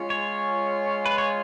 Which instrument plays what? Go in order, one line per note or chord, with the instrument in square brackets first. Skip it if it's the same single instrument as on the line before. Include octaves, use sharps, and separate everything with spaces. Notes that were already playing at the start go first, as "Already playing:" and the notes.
Already playing: [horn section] G#3 C#4 F4
[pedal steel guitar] C#5
B4
C#5